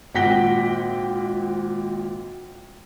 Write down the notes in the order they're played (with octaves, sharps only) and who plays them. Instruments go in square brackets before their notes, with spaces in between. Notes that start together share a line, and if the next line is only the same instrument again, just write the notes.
[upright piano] G#1 A#2 F#5 G5 B6 G7